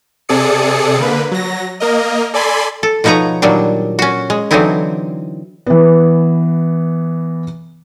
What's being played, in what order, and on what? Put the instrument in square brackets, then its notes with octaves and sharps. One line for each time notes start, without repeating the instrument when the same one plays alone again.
[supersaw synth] C3 G#4 A4 D5 D#6 C#7
D3 A#3 B4
F#3 A#6
A#3 A#4 D#5
A4 D5 G#5 B5 C6
[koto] A4
B2 F3 D#4 B4 C#5 A#5
A#2 D#3 F#3 G3 D4
C#4 F#4
G#3
D3 E3 F#3 C4 D#4 E4
[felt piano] E3 B3